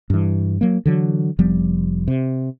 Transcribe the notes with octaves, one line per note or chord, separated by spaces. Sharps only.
G2 E3
F#3 A#3
D3 E3 F#3
F1 F3 G3 B3
C3